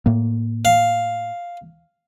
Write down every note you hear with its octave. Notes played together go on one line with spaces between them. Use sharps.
A2 A#3
F5